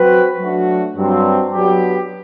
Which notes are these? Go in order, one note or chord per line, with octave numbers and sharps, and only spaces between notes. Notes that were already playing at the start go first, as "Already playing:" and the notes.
Already playing: F#3 C4 F#4 B4
F#3 A3 D4 F#4
G2 F#3 C4
F#3 B3 D4 G4